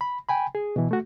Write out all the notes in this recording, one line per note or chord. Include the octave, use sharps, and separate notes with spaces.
B5
G5 G#5 B5
G#4
B2 E3
A3 F#4